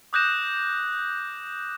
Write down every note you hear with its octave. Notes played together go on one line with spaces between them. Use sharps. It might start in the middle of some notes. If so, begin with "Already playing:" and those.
D6 D#6 F#6 G6 A#6 E7